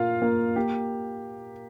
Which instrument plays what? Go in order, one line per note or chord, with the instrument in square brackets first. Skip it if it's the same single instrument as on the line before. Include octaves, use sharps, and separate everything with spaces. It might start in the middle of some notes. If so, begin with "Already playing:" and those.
Already playing: [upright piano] A#2 A#3 [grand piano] F4 F5
[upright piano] A#3
[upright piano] A#3 [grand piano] G4